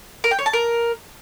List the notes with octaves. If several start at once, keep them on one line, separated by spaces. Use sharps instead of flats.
A#4
G5
C#5
A5
A#4